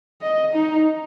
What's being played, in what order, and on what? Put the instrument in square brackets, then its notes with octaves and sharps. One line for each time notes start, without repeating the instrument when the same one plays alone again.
[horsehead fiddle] D#5
D#4